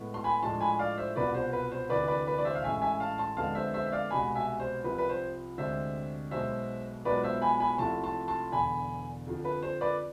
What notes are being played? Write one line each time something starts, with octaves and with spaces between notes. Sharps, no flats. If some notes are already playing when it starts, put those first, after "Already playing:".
Already playing: A2 G#3 B3
C6
G#5 B5
A2 F3 G#3 D4 A5 C6
G#5 B5
D5 F5
C5 E5
C2 B2 B3 F4 B4 D5
C5
B4
C5
D2 C3 E3 B4 D5
B4 D5
B4 D5
D5
C5 E5
F5
A1 A2 G#3 E5 G#5
E5 G#5
F5 A5
A5 C6
F2 D3 G#3 B3 D4 F5 A5
C5 E5
C5 E5
E5
D5 F5
C2 B2 G#3 G#5 B5
E5 G#5
C5
C2 C3 F3 B4
B4
C5
D2 C3 G#3 D4 C5 E5
B1 B2 G#3 C5 E5
B1 B2 G#3 B3 F4 B4 D5
C5 E5
G#5 B5
G#5 B5
C2 C3 F3 A3 E4 A5 C6
A5 C6
A5 C6
E1 E2 D3 G#5 B5
F2 D3 F3
B4
C5
B4 D5